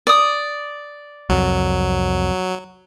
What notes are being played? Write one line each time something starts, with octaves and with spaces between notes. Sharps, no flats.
D5 D#6
C2 F2 F#3